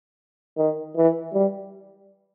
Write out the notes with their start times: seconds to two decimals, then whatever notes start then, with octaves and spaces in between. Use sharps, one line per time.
0.57 D#3
0.96 E3
1.34 G3